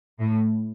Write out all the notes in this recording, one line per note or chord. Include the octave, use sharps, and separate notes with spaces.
A2